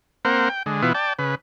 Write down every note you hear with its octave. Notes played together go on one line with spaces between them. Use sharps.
A#3 C4 A#4 C5 F#5
G5
D3 G#3
B2 E3 B3 E4 F4
D5 G5 A5
C#3 B4